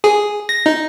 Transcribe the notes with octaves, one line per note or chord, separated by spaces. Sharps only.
G#4
A#6
D#4